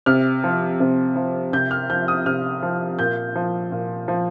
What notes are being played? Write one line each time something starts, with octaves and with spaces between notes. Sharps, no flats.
C3 F6
F3
C3
F3
C3 G6
F6
F3 G6
D#6
C3 F6
F3
A#2 G6
F3
A#2
F3